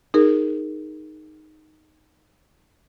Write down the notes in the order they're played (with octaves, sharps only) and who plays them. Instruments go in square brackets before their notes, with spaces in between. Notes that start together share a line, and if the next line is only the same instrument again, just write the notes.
[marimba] D#4 G#4 A#4